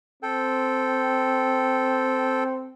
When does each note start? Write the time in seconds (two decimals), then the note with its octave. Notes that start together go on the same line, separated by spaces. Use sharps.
0.23 C4 A4 G5